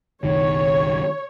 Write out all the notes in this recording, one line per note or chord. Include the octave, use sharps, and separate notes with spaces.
F#1 B1 D#3 C#5